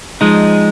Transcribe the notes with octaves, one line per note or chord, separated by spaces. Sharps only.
F3 G#3 D#4